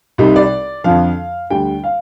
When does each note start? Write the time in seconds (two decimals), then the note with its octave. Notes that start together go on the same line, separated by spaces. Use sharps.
0.18 C2 C3 G3 D#4
0.36 D5
0.84 F2 D3 F3 F5
1.50 D2 D3 G3 G5
1.84 F5